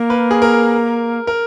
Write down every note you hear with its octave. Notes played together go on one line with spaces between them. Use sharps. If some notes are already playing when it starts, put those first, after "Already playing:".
Already playing: A#3 A#4
B4
G#4
A#4
A#4